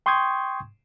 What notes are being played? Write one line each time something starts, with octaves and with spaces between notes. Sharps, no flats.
G5 C6 C#6 D#6 G6 G#6